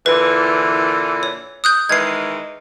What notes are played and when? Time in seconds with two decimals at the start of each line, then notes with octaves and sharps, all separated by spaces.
0.06 A#2 D3 E3 B4
1.23 C#5
1.64 D#6 F#6 G6
1.89 D#3 E3 G#3 G#6 C7